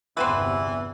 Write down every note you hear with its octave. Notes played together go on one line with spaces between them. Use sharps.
G1 E2 C3 E3 C4 F#4 B4